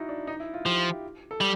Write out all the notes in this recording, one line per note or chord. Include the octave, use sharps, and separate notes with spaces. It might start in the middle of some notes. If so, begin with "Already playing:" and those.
Already playing: D#4 E4 F#4
D4
D#4
E4
F4
F3 G4
A4
G3